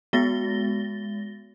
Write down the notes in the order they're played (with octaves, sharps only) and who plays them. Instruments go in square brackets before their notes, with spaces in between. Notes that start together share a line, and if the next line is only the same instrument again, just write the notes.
[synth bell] G#3 B3 F#4 A6 A#6 G7